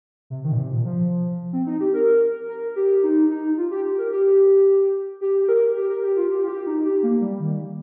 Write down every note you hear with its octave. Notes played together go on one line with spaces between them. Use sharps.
C3
D#3
A#2
C3
A#2
F3
C4
D#4
G4
A#4
A#4
G4
D#4
D#4
F4
G4
G4
A#4
G4
G4
G4
A#4
G4
A#4
G4
F4
G4
F4
G4
D#4
G4
A#3
G3
D#3